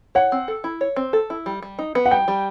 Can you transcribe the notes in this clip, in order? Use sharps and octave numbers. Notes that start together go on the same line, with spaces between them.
C#5 F#5
C4
A4
E4
C#5
C4
A4
E4
G3
G3
D#4
B3
F#5
G3 G5
G3